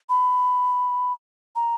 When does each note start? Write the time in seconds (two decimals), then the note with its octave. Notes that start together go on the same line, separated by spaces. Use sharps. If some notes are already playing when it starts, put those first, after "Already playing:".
0.09 B5
1.56 A#5